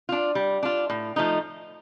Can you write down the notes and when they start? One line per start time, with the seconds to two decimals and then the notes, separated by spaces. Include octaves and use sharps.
0.09 D4 F4
0.35 G3
0.63 D4 F4
0.90 A2
1.16 F3 A3 D#4